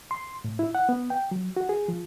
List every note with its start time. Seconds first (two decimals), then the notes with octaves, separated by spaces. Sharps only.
0.11 C6
0.44 A2
0.59 E4
0.75 F#5
0.89 B3
1.10 G5
1.31 F#3
1.57 F#4
1.69 G#4
1.88 F3